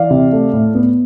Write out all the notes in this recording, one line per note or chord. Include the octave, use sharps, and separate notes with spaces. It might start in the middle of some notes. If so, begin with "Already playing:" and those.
Already playing: E3 D5 F5
C3
A3
A2
B3